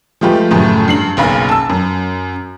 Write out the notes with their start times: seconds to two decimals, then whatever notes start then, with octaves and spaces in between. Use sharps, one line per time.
0.21 F3 G#3 A3 F4 G4 B4
0.51 F#2 A2 C#3 F3 A3
0.88 G2 C7 F#7
1.17 F#1 B1 F#2 F5 B5
1.49 A5 E6
1.69 F#2